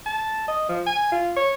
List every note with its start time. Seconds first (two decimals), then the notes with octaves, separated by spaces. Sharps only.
0.06 A5
0.48 D#5
0.69 F3
0.87 G#5
1.12 F4
1.36 C#5